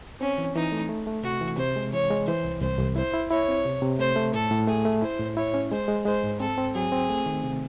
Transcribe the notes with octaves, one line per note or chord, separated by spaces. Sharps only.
C4 C#4
E3
E3 D#4
A3
A3
A3
C3 F#4
E3
C3 C5
G#3
E3 C#5
G#3
E3 C5
C2
C2 C5
C2
E4 C5
E4
E4 C#5
C4
C3
C3
A3 C5
A3
A2 A4
A2
A3 G#4
A3
E4 C5
A2
E4 C#5
C#4
G#3 C5
G#3
G#3 C5
G#2
C4 A4
C4
F#3 G#4
C4
A3
D#3
C3